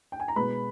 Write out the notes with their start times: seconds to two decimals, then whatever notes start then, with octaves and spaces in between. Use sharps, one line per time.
0.12 G5
0.20 G#5
0.28 A#5
0.36 B2 G#3 B4 B5